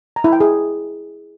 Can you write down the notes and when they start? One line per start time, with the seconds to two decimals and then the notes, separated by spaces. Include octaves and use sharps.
0.16 A#5
0.24 E4
0.32 G5
0.40 G#4